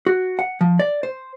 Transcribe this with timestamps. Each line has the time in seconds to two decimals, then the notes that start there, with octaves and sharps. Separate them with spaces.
0.06 F#4
0.39 F#5
0.61 F3
0.79 D5
1.03 C5